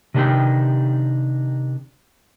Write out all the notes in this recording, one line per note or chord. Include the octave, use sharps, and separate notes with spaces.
C3 D#3 D4 D#4 G4 G5